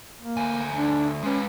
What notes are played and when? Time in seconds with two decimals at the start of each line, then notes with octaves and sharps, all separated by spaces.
0.21 A#3
0.37 D2 G#5
0.76 D4
1.24 G#3 C#4 B4